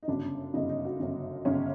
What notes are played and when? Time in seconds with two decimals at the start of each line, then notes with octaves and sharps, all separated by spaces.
0.03 D#4
0.08 G1 F#2 C#3 D4
0.54 G1 F#2 C#3 D#4
0.69 D#4
0.85 F#4
1.00 G1 F#2 C#3
1.45 G1 F#2 C#3 C#4